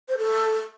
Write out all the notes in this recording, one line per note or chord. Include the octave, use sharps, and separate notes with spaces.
C5
A4